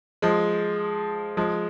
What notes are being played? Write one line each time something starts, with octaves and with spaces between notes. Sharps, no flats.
F3 G#3
F3 G#3